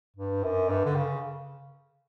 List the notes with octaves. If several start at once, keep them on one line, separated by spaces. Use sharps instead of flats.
G2
F#2
G2
D3
C#3